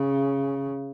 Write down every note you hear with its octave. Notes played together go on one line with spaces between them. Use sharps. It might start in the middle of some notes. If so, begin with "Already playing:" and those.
Already playing: C#3